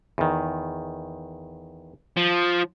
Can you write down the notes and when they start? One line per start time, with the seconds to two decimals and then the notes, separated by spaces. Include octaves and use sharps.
0.18 E2 D#3
2.17 F3